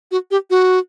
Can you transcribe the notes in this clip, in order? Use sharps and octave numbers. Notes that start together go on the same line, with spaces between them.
F#4
G4
F#4